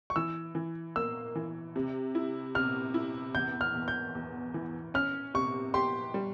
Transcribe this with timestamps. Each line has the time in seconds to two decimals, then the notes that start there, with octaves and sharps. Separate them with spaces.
0.10 C#6
0.16 E3 E6
0.55 E3
0.96 A#3 E6
1.35 E3
1.76 C3
2.15 E4
2.55 C3 F6
2.94 E4
3.35 E2 G6
3.61 F6
3.75 E2
3.88 G6
4.15 E2
4.54 E3
4.94 C#4 F6
5.34 C3 C#6
5.74 G4 C6
6.14 G3